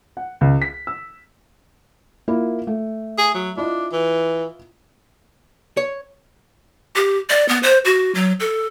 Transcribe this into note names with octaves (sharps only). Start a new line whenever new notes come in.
F#5
C#2
B6
E6
A#3 E4 F4
A3
G#4
F#3
D4 E4 F4 D#5
E3
C#5
G4
D5
B3
C5
F#4
F#3
A4